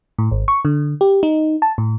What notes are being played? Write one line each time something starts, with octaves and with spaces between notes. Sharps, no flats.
A2
G#1
C#6
D3
G4
D#4
A5
A2